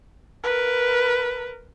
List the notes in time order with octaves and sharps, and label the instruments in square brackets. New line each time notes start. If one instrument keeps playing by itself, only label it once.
[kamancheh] A#4 B4